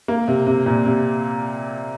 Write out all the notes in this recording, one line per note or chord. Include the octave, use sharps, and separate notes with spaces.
A#3
C3
C3
A#2
C3